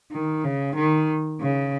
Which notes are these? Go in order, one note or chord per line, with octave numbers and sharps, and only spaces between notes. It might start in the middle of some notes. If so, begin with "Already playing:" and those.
D#3
C#3
D#3
C#3